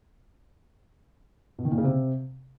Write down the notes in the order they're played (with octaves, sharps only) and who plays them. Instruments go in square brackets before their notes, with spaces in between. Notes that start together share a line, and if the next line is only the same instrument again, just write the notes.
[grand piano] B2
D#3
A#2
C#3
C3